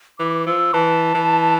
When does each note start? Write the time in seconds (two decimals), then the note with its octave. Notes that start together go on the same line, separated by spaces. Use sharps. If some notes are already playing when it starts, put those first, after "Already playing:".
0.19 E3 D6
0.47 F3 E6
0.73 E3 A5
1.14 E3